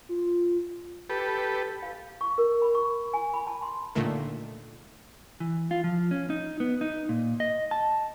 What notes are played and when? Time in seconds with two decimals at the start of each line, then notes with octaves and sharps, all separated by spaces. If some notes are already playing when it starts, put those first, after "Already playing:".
0.09 F4
1.10 G4 A4 B4
1.83 F5
2.21 C#6
2.38 A#4
2.62 B5
2.75 C#6
3.13 G#5
3.34 B5
3.47 A5
3.63 C6
3.95 A#2 D3 D#3 A3 A#3
5.40 E3
5.71 F4
5.84 F3
6.11 C#4
6.30 D#4
6.60 B3
6.81 D#4
7.09 A#2
7.40 D#5
7.71 A5